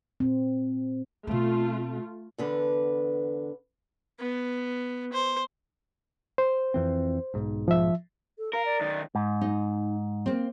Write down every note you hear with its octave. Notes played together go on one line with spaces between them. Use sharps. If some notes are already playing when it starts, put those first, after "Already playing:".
A#2 C4
B2 A3 C4 F4
E2 D3 B4
B3
C5
C5
F2 E3 C4
B1 G#2
F3 E5
A4
A#4 F5
D5
B1 D#3
G#2
D#4
A#3 C4